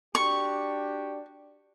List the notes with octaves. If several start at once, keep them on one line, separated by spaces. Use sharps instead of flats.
D4 F#4 G4 C#6